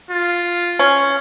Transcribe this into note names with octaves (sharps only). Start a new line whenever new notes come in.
F4
C#4